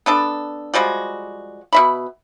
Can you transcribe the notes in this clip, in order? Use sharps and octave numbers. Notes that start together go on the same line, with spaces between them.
B3 D4 A4
F3 G3 G#3 F#4
B2 E5 B5